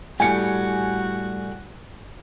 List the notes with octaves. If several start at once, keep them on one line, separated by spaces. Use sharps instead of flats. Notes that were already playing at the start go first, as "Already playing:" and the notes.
A2 G3 F#4 G#5 C#7